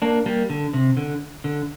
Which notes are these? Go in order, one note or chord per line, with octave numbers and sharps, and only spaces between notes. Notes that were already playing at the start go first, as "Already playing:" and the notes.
A#3 D4
G3 A#3
D3
C3
D3
D3